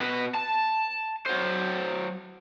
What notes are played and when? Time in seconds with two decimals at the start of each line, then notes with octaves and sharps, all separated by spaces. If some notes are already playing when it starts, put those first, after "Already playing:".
0.01 B2 B4
0.35 A5
1.26 F#3 C5